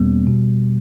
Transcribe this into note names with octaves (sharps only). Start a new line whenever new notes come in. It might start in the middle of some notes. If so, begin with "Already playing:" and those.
Already playing: E2 B2 G3 A#3 B3 C#4
B2